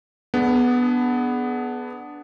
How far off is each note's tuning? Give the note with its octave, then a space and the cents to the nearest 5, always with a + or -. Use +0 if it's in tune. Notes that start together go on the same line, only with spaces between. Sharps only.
B3 +0 D4 +0 G#4 +30